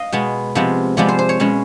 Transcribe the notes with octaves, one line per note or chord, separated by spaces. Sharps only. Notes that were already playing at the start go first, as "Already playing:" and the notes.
Already playing: D#5 F5
B2 G#3 B3
C3 F3 G#3 B3
C3 F3 G#3 B3 D5
C5
C5
C#5
B2 G#3 C#4